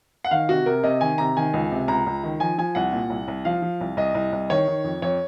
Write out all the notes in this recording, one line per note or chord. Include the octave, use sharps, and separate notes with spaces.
F#5
D#3 F5
C3 F#4
C3 A#4
C3 D#5
D#3 G#5
C3 A#5
D#3 G#5
C#2
C3
C#2 A#5
C#2
D#3
F3 G#5
F3 G#5
C2 F#5
A#2
C2
C2
F3 F5
F3
C2
C2 D#5
C2
C2
D#3 C#5
D#3
F2
F2 C#5